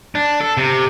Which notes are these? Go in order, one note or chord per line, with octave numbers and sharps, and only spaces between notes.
D4
A4
C3